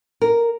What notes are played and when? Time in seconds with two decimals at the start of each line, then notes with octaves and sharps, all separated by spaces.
0.21 A#4